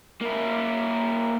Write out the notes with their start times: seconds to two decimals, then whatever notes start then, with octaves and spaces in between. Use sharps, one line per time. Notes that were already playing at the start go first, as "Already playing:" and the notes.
0.21 A#3 E4